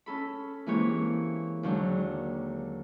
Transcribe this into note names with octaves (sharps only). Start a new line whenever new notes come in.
C#4 A4 B5
E3 G#3 A#3 C4 G4 C#5
D#2 D3 F#3 G#3 D4